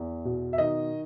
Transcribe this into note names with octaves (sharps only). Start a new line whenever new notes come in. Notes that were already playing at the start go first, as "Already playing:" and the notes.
Already playing: E2
B2
E5
D#3 D#5